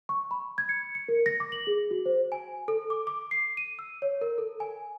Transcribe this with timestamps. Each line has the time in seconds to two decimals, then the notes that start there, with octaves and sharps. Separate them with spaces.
0.09 C#6
0.31 B5
0.58 G#6
0.69 C#7
0.95 C#7
1.08 A#4
1.26 A#6
1.40 D6
1.52 F#7
1.67 G#4
1.91 F#4
2.05 C5
2.32 G#5
2.68 A4
2.90 D6
3.07 D6
3.31 C7
3.57 D#7
3.79 E6
4.02 C#5
4.21 A#4
4.38 A4
4.60 G#5